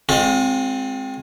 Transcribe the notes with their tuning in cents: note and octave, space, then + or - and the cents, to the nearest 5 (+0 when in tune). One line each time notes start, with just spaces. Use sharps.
G#3 +0 C4 +0 F4 +40